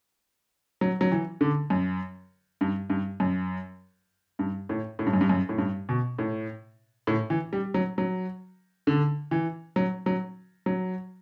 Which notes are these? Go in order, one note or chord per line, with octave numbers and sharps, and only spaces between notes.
F#3
F#3
E3
D3
F#2
G2
G2
F#2
G2
A2
A2
G2
F#2
G2
F#2
A2
G2
B2
A2
A2
E3
G3
F#3
F#3
D3
E3
F#3
F#3
F#3